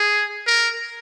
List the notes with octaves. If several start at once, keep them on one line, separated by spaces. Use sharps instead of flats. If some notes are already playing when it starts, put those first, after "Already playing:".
Already playing: G#4
A#4